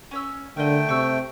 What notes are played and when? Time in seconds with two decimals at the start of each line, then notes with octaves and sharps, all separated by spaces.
0.11 C#4 C#5 E6
0.57 D3 A3 A#4 C5 D#5 G5
0.89 C3 C#6 E6